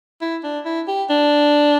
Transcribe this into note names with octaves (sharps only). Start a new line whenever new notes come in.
E4
D4
E4
G4
D4